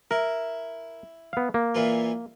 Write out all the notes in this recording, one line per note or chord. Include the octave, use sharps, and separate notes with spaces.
E4 A#4
B3 F5
A#3
A#2 E3 F4